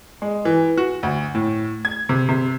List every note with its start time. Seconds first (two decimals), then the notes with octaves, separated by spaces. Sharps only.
0.22 G#3
0.45 E3
0.77 F#4
1.03 D2
1.35 A2
1.85 G#6
2.09 C3
2.29 C3